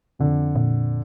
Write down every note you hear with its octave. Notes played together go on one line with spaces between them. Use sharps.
F2 D3
A#2